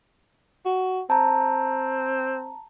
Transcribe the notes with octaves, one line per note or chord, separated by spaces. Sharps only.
F#4
C4 A5 A#5